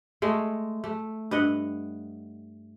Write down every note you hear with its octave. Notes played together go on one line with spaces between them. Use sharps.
G#3 A3
A3
G2 D#5 F#5